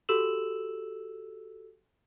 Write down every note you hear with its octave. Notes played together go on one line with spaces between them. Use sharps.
F#4 G4 A4 E6 E7 F#7